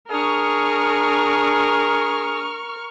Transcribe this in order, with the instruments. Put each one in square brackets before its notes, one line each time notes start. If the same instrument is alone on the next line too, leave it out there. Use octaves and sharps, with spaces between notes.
[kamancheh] D4 D#6 [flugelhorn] G#4 [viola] A#4 [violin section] C#6 F6